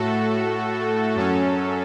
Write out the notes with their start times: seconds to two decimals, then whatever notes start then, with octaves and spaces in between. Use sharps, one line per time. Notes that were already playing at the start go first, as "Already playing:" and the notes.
Already playing: A2 A3 F#4 A4
1.15 F#2 F#3 C#4 A4